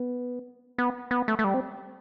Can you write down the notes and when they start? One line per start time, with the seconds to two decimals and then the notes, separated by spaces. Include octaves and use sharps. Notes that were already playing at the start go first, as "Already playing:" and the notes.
Already playing: B3
0.78 B3
1.11 B3
1.28 A3
1.39 A3
1.44 G3
1.54 C4